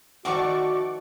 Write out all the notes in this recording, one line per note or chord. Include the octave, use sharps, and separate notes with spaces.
D#3 F3 A3 F#4 D5 F#5 C#6 D6